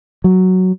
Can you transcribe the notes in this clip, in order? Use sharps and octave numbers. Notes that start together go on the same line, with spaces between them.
F#3